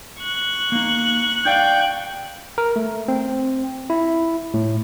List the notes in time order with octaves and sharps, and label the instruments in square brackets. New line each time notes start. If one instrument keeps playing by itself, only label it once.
[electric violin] C#6 F#6
[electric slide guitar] A#3 D#4
[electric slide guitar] D#4 D5 F5 [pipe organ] G5
[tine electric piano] A#4
A3
C4
E4
A2